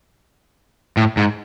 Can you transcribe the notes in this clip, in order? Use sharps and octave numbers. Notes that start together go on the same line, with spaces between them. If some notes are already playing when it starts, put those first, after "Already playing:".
A2
G#2